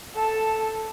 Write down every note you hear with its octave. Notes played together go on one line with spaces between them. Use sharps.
A4 A5